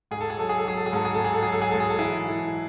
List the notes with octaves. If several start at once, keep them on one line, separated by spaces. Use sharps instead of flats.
G#2 G#4
A4
G#4
F#3 A4
G#4
A4
F#3 G#4
A4
G#4
G#2 A4
G#4
A4
G#2 G#4
A4
F#3 G#4
A4
G#4
G#2 A4
G#4
A4
E3 E4 G#4
E3